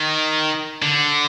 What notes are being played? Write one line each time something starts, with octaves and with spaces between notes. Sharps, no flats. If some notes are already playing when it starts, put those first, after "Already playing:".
Already playing: D#3
D3